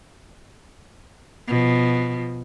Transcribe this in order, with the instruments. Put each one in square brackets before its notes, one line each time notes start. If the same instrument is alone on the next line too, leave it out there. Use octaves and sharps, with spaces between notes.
[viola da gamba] B2 F3